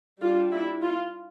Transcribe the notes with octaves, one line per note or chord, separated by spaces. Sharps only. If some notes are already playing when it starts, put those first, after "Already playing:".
G3 D4 F4
E4
F4